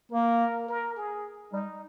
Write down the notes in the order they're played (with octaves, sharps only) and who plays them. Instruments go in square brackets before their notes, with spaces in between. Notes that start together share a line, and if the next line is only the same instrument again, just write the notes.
[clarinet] A#3 [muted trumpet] A#4
[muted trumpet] A#4
G#4
[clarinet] G3 [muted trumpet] D#4